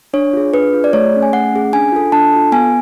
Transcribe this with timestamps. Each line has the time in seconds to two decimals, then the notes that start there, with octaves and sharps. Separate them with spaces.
0.14 D4 C#5
0.33 F4 G#4
0.53 D4 B4
0.73 F4 G#4
0.84 D5
0.93 A3 C#5
1.13 C#4 G#4
1.23 G#5
1.33 A3 F#5
1.53 C#4 G#4
1.73 D4 G#5
1.92 F4 A4
2.12 D4 A5
2.32 F4 A4
2.52 B3 G#5